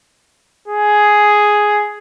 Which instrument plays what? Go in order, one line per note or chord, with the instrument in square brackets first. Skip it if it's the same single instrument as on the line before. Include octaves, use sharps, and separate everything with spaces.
[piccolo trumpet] G#4